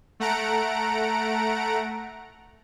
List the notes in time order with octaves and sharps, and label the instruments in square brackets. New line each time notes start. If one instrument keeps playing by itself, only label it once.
[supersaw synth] A3 F#5 A#5 D7